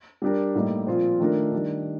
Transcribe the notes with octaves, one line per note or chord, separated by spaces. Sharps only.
G3 D4 G4 A#4
A2 G3 A#3 D#4
A#2 F3 C4 F4
D#3 A3 D4 F4 A#4
D#3 G3 D4